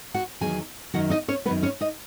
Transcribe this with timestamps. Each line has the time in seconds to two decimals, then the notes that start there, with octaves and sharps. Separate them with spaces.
0.14 F#4 F#5
0.41 E2 D#3 F#3 G#4 G#5
0.94 F#2 D#3 F#3 F#4 F#5
1.10 D#4 D#5
1.28 C#4 C#5
1.45 F#2 D#3 F#3 B3 B4
1.63 C#4 C#5
1.81 D#4 D#5